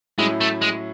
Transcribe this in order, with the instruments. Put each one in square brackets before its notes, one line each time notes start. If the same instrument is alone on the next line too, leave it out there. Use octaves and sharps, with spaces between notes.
[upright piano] A2 F#3 C#4 E4 [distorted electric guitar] G#3
[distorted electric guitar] A3
G#3